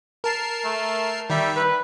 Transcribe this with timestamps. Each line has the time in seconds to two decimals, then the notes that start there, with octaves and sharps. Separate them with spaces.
0.24 A#4 A5 C7
0.65 A3
1.30 D#3 G3 E5
1.56 B4